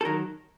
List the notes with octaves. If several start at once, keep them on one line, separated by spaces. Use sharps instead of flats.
A4
D#3 F#3 A#4